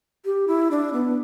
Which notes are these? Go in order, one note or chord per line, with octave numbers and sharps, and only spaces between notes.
G4
E4
D4
B3